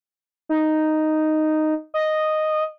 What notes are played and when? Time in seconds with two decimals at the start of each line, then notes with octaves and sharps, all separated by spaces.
0.49 D#4
1.94 D#5